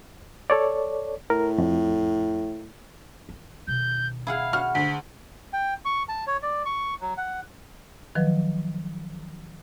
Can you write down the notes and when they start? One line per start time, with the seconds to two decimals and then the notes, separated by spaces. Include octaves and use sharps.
0.50 A4 C#5 D5
1.30 A2 A#4
1.58 F2
3.29 D#3
3.67 B2 D#3 G6
4.27 E4 G#4 F5 F#5
4.53 F#4 F6
4.75 D2 B6
5.53 G5
5.85 C#6
6.09 A5
6.27 C#5
6.43 D5
6.66 C#6
7.01 F#3
7.17 F#5
8.15 D#3 F3 F#3 B4